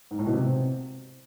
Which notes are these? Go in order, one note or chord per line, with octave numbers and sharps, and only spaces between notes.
G#2
A2
B2
C3